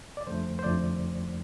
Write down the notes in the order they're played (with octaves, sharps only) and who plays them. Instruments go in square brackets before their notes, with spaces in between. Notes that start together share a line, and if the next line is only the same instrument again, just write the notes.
[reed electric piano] D5
F2 D3 F3 A3 C5
C5
F2 D3 F3 A3 D5